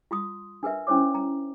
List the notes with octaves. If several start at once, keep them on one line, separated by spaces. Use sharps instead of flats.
F4 C6 D#6
D4 A#4 B4 E5
C#4 D4 E4 C5 C#5 D6
A#5